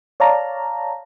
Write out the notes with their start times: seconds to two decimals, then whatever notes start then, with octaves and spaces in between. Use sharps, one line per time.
0.20 C#5 D5 F5 A5 A#5